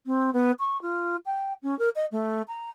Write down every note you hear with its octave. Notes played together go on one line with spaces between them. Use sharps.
C4
B3
C#6
F4
G5
C#4
A#4
D#5
A3
A#5